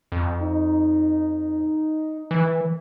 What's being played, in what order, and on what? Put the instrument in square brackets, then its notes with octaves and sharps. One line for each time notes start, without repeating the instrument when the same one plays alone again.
[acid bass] F2
[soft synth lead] D#4
[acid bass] E3